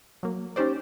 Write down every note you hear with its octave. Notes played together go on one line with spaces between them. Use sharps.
F#3 A#3
C#4 D#4 G4 C5 D5